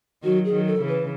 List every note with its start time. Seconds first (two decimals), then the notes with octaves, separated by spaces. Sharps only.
0.23 D#3 F#3 F#4
0.45 G#4
0.52 D#3 F#3
0.67 A4
0.80 C#3 E3
0.88 B4